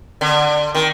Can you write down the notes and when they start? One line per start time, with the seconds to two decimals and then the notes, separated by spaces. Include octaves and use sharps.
0.21 D3
0.75 D#3